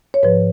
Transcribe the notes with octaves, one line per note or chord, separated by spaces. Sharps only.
C#5
G#2 F3 B4